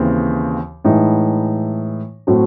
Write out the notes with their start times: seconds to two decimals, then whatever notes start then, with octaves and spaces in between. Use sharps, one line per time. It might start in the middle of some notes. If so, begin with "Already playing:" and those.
Already playing: D#2 C#3 E3 C4
0.85 A2 E3 G#3 D#4
2.27 A2 F#3 A3 C4 F#4